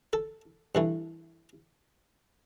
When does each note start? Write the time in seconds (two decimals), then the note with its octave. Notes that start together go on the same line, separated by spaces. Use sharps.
0.13 A4
0.75 G2 E3 A3